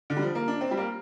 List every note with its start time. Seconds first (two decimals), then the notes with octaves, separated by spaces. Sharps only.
0.10 D3
0.17 G3
0.22 F3
0.35 A#3
0.48 D4
0.61 C4
0.71 G3
0.77 A#3